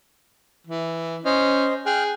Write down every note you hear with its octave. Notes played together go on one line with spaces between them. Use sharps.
E3
C#4 C5 D#5
G#4 G5 F6 F#6